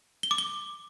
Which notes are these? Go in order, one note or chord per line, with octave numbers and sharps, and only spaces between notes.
G7
D6
G7